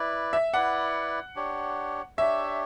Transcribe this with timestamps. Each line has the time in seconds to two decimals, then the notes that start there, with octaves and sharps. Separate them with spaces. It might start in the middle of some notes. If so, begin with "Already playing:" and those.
Already playing: E4 B4 D5
0.33 E5
0.53 E4 B4 D5 F#5
1.36 D4 G4 C#5
2.18 D4 G4 C#5 E5